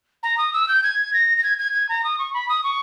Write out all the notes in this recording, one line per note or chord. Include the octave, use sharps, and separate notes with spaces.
A#5
D#6
E6
G6
G#6
A#6
A#6
G#6
G#6
G#6
A#5
D#6
C#6
B5
D#6
C#6